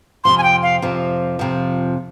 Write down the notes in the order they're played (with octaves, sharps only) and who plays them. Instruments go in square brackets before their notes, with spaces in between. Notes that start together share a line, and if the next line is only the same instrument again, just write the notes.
[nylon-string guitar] F2 C3 F3 [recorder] C6
[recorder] G#5
G5
F5
[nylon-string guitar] F2 C3 F3
F2 C3 F3